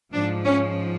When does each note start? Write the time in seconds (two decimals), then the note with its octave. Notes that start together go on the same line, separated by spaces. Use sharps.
0.12 G#2 F3 D4
0.44 C#4